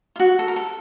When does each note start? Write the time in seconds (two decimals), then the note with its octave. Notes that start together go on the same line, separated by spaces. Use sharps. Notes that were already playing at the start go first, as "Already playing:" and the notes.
0.16 F4
0.20 F#4
0.39 A4
0.48 A#4
0.56 A4